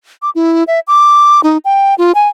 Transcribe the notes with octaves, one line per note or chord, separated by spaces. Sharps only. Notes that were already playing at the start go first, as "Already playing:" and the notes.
D6
E4
E5
D6
D#4
G5
F4
G#5